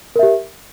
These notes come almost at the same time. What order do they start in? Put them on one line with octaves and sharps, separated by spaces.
A#4 E5 G4